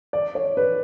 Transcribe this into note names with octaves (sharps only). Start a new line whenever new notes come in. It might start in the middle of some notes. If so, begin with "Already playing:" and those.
D5
C#5
B4